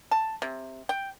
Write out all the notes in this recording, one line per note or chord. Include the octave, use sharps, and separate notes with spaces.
A5
C3
G5